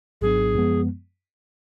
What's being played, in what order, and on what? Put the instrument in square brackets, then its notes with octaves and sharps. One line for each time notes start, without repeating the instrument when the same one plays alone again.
[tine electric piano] G#1 G#2 F#3 B3 D4 [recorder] G#4
[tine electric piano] F#2 F3 G#3 B3